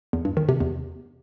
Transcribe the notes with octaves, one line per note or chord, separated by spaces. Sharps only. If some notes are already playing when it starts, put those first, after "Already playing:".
E2
G2
D#3
C3
E2